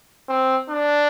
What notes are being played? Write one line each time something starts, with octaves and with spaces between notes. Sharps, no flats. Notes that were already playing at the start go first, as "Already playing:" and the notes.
C4
D4